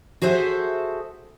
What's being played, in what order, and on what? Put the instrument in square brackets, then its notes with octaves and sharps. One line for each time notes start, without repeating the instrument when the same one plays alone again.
[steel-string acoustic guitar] F#4 G#4 A4 C5 E5